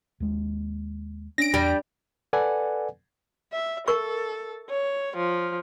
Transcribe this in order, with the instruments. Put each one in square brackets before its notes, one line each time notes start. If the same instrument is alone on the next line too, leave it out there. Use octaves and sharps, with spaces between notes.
[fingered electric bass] D#2 G#3
[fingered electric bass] C#4 [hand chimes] D4 [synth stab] A#6 D7
[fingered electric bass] E2 [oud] G3
[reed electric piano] A4 B4 D5 F#5 G#5
[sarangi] E5
[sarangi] A4 [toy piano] A#4 C#6
[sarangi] C#5
F3